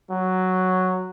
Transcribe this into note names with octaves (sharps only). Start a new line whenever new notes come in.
F#3